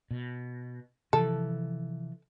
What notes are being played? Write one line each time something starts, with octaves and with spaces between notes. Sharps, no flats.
B2
C3 E3 F3 A4